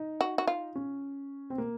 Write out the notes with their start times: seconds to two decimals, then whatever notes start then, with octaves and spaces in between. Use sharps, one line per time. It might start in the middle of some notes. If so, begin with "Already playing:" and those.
Already playing: D#4
0.21 F#4
0.38 F#4
0.47 F4
0.75 C#4
1.50 C4
1.58 A#3